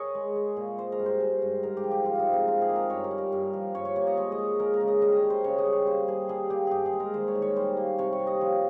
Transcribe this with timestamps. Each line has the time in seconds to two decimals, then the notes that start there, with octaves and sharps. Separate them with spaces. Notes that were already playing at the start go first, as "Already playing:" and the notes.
Already playing: G#4 A#4 C#5 D#5
0.15 G#3
0.36 G#3
0.57 A#2
0.78 G#3 C5
0.92 A#4
0.99 G2
1.06 C5
1.20 G#3
1.42 G2
1.63 G#2 A#4
1.77 G4
1.84 F3
1.91 G4
2.05 F3 F4
2.15 D#4 F4
2.26 G#2
2.33 C4
2.47 A#3 F4
2.61 G#4
2.69 A#3
2.76 A#4
2.90 G2 C#5
3.04 A#4
3.11 G3
3.18 A#4
3.32 G2
3.53 F3
3.75 G2 C#5
3.85 C#5
3.96 A#3 C#5
4.07 D#5
4.17 G#3 C#5
4.32 D#5
4.38 G#3
4.60 G#3 A#4
4.74 A#4
4.81 C#3
4.88 D#5
5.02 G3 D#5
5.12 C#5 D#5
5.23 G3
5.30 C5
5.44 C#3 C#5
5.58 D#5
5.65 G3
5.73 C#5
5.87 A#3 C5
6.08 G3 G#4
6.29 G3 G#4
6.50 A#3 G4
6.67 G2 G4 G#4
6.86 G#4
6.93 G#3
7.00 A#4
7.14 D#3 C5
7.28 C#5
7.35 D#3
7.42 C#5
7.56 G3 C5
7.77 A#3
7.98 C3 C#5
8.13 C#5
8.20 C3
8.27 D#5
8.41 F3 C#5